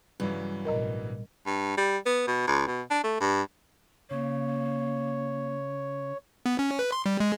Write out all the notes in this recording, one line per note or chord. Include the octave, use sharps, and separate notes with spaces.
G2 C#3 E3 F#3
A1 B2 A#4 D#5 A#5
G2
G3
B3
B2
C#2
B2
D4
A3
G2
C#3 A#3 C#5
B3
C#4
B4
C6
G3
G#3